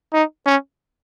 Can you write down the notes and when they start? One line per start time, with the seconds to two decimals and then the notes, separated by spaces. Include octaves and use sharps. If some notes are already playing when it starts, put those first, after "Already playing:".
0.13 D#4
0.46 C#4